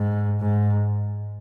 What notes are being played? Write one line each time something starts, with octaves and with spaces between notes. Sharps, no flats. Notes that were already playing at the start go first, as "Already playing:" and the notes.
Already playing: G#2
G#2